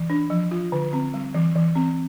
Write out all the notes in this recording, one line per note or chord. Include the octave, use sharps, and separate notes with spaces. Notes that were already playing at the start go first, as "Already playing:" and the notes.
Already playing: E3
D4
F3
F4
D3
C4
G3
E3
E3
C4